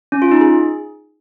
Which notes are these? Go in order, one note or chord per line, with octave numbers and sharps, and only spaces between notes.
C#4
F4
D#4
G#4